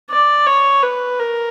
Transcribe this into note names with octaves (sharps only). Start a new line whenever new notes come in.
D5
C#5
B4
A#4